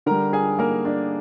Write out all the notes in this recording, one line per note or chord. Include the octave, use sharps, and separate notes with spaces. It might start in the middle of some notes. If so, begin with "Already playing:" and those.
D3 G3 A#4 A#5
G#4 G#5
A#3 A#4
D4 D5